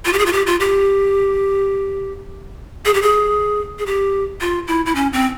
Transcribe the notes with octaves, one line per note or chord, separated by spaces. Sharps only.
F4
G4
G#4
F4
G4
F4
G4
G#4
G4
G#4
G#4
G4
F4
E4
E4
C#4
C4